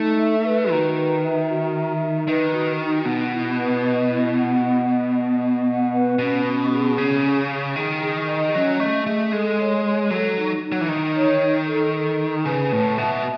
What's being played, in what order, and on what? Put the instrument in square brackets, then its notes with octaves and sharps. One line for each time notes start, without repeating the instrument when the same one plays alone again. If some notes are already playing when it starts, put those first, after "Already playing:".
Already playing: [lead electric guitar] A3 [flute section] D#4
[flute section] E5
B4
[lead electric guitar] D#3 [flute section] F#4
[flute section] B4
E5
F#4
E5
D#4
[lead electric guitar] D#3 [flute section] B4
[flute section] F#4
D#4
[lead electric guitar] B2 [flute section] F#5
[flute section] E4
B4
D#5
E4
F#5
D#5
D#5
D#5
D#5
F#5
B4
[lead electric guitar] B2 [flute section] C#4
[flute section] C#4
G#4
[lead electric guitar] C#3 [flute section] C#4
[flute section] G#4
G#4
[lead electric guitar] D#3 [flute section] G#4
[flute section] G#4
D#5
[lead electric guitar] F#3 [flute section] C#4
[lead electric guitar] A3 [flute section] D#5
[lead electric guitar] A3 [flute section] G#4
[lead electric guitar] G#3 [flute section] A4
[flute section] C#5
C#5
[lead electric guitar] F#3 [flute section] A4
[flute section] D#4
D#4
[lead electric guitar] F#3
E3
[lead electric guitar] D#3 [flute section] D#4
[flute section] C#5
D#4
A4
A4
D#4
[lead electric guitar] C#3 [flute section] B4
[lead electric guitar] A2 [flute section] A5
[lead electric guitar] B2 [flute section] E5